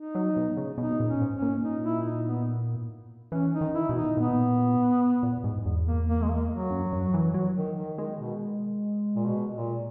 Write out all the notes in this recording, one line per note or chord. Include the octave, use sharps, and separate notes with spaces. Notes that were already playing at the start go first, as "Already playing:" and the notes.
Already playing: D#4
F#3
B2
C#3
B2 D#4
A#2
C#4
G#2
C#4
A#2
D#4
E4
D#4
B3
E3 C#4
D#4
D#3
E4
B2
D#4
A#2 B3
A#2
G#2
E2
A#3
A#3
G#3
A#3
F#3
F#2
F#2
E3
F#3
D#3
D#3
D#3 G#3
B2
A#2
B2
A#2